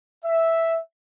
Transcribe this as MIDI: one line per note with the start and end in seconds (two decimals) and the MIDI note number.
0.25 0.79 76